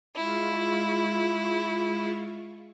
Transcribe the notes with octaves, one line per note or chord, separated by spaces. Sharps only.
G#3 E4 F4 C#6